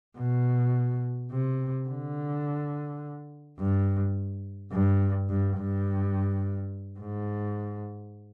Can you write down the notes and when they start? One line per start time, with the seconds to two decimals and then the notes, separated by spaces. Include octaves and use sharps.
0.18 B2
1.31 C3
1.88 D3
3.59 G2
4.72 G2
5.30 G2
5.58 G2
6.99 G#2